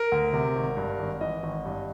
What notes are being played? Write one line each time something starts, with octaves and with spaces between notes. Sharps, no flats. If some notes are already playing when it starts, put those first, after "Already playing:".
Already playing: A#4
D2
C3
G#1
G2
G#1
E3 D#5
G#1
G2